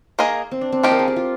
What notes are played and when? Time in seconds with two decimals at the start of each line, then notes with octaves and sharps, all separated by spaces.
0.19 A#3 D#4 G#4 D#5
0.51 C4
0.61 D4
0.72 C4
0.83 F3 A#3 D#4 F4 G4
0.91 A#4
0.99 G#4
1.08 G4
1.16 F4